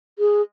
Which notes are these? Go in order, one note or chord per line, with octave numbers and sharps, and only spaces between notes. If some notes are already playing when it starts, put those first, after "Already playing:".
G#4